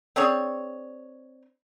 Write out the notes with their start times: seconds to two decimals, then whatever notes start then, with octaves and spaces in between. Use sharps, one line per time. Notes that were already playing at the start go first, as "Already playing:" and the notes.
0.16 C4 D4 G#4 C#5